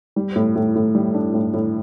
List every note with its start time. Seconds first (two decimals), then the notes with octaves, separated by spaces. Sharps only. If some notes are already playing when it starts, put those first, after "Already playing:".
0.16 G3
0.36 A2
0.55 A2
0.75 A2
0.95 G3
1.14 D4
1.34 A2
1.53 A2